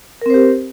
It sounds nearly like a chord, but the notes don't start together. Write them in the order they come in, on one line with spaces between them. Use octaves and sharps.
A#4 C4 C5 G4